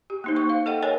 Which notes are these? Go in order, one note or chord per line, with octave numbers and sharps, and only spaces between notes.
G4
A#3 D#4 C5
A#3 C5 C#6
C5 F5
A4 D#5 F#5 G5
G#4 A#4 C#5 D#5 G#5